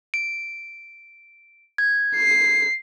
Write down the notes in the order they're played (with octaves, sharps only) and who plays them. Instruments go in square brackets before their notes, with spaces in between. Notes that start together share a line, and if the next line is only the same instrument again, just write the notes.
[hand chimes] D7
G#6
[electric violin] C7